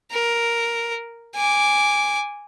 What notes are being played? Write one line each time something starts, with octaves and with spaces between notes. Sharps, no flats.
A#4
G#5 D6